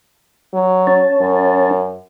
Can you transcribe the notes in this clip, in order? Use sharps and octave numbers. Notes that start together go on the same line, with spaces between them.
F#3
C#4 C#5 A5
F#2